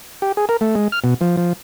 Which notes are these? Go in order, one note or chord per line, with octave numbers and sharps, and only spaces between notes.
G4
G#4
A#4
A3
G#3
F6
B2
F3
F3